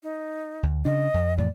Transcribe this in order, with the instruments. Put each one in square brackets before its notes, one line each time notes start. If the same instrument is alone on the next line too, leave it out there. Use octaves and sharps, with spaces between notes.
[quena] D#4
[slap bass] D2
[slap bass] C#3 D4 [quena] D#5
[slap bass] F2
[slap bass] F2 A2 E3 [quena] D5